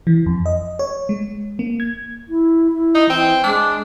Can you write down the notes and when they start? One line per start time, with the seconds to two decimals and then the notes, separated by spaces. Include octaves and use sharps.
0.07 E3
0.26 F2
0.46 D#5
0.79 C#5
1.09 G#3
1.59 A#3
1.80 G#6
2.29 E4
2.72 E4
2.95 D#4
3.10 E3 C4
3.43 G#3 D4